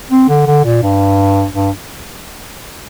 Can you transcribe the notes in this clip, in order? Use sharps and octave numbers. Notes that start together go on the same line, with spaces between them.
C4
D3
D3
A#2
G2
G2